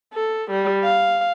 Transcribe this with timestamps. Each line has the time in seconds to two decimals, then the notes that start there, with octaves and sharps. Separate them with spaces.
0.14 A4
0.51 G3
0.84 F5